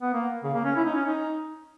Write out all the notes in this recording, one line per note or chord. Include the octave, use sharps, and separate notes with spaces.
B3
A#3
C#3
A#3
C#4
E4
D#4
C#4
D#4